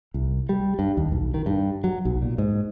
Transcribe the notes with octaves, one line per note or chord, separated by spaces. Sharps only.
C2
G3
G2
D#2
B1
D#3
G2
F#3
B1
A#2
G#2